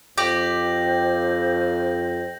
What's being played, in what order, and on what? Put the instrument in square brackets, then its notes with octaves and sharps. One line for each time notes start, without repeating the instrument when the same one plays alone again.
[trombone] F2 [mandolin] G4 [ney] C5 [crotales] G6 A#6 F#7